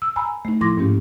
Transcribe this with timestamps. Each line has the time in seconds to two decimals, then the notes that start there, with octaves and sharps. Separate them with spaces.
0.02 E6
0.16 G#5 A#5 B5 E6
0.45 A3 D#4
0.61 A2 F3 E4 C6 D6 A#6
0.77 G#2 A#3 C#4 G4